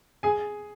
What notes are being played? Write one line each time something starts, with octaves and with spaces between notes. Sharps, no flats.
G#4 G#5